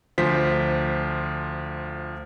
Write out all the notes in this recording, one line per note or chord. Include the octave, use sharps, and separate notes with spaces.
D2 F3 C5 B6